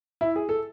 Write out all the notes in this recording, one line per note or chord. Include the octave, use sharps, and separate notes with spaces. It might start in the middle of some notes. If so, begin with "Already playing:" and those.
E4
G#4
A4